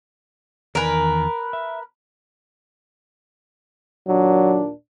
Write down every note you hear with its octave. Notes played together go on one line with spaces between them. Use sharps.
E2 D#3 A#4 B4 G#5
E5
D#2 A#2 F#3 D4